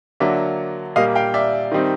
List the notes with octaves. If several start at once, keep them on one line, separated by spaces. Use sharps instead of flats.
D3 F#3 A#3 D5 E5
A#2 G3 A#3 D#5 F5
F5 G5
D5 E5
D#3 G3 C4 D#4